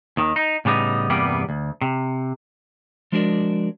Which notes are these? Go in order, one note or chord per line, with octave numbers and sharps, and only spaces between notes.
D#2 D#3
D#4
A2 C#3 G3 B3 D#4
E2 G2 C3 G3 A#3 B3
D2
C3
F3 G#3 D4 F#4 A#4 D5